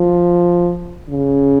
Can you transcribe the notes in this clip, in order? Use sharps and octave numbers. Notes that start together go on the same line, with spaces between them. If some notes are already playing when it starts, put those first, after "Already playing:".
Already playing: F3
C#3